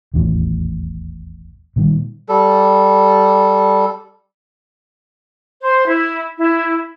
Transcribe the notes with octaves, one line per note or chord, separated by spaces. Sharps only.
D#1 A1 E2 A2
A#2 D#3 G3
G3 A4
C5
E4
E4